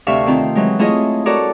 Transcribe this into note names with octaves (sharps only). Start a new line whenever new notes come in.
D2 C3 A3 E5 F5 C#6
D#3 C4 F4
E3 F#3 G#3
A3 E4 F4 G#4 C#5 D#5
F#4 A4 A#4 C#5 D5